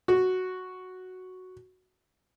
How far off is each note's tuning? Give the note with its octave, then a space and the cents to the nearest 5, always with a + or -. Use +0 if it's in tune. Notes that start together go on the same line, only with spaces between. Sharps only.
F#4 +0